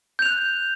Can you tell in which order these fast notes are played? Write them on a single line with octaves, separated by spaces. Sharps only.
G6 F7 F#6